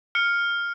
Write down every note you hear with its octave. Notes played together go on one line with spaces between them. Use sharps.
F6 C#7